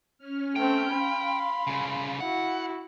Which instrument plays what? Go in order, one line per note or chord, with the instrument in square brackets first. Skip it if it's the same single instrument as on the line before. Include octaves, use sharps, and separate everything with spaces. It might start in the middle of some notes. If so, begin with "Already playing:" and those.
[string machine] C#4 F6
[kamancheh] A3 C4 [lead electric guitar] G5
[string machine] F5 [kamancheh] B5 C6
[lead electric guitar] C2 C#3
[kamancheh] E4 F#4 [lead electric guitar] F#5